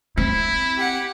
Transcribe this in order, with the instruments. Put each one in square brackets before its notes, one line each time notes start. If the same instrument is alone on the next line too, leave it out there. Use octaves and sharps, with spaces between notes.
[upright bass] C4 [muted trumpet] E4
[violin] G4 F#5